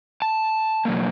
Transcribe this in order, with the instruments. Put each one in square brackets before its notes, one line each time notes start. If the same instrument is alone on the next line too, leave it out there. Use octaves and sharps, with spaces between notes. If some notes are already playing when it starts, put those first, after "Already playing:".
[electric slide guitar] A5
B2 F#3 A#3